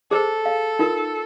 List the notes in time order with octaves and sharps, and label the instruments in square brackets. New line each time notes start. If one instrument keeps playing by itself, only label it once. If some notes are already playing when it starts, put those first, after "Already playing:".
[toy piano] G#4 C5 [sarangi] A4
[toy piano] F5
D#4 F4 A#4